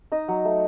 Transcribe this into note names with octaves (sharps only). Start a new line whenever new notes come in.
D#4 D#5
F#3
A3